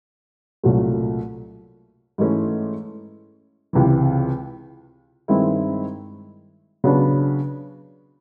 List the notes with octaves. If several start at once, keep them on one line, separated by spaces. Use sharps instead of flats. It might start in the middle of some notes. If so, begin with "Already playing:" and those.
C2 A#2 F#3 A3
G#2 E3 A3 C#4
C#2 C3 E3
G2 D#3 G#3 C4 E4
C#3 F#3 B3 D4